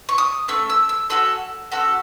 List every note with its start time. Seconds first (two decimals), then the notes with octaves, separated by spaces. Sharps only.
0.09 C#6
0.18 D#6
0.48 A3 C#4 E6
0.70 E6
0.89 E6
1.10 C#4 F#4 A4 E6
1.72 C#4 F#4 A4 E6